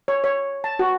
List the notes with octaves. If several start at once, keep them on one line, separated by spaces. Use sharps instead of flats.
C#5
C#5
A5
F#4